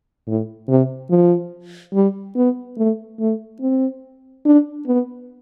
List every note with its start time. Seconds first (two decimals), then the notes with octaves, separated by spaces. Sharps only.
0.27 A2
0.68 C3
1.10 F3
1.94 G3
2.36 B3
2.78 A3
3.19 A3
3.61 C4
4.45 D4
4.87 B3